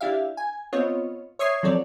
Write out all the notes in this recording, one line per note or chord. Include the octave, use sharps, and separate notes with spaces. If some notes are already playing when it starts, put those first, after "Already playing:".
D4 E4 G4 E5 F5
G#5
B3 C4 F4 C#5 D#5
C#5 E5 C#6 D#6 G#6 C7
F3 F#3 C4 A4 C#5 D5